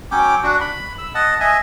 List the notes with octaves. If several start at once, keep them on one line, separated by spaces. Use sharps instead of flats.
F#3 C#4 G5 D6
D4 F#4
B5
E6
D#5 F#5 A5
D#5 E5 G#5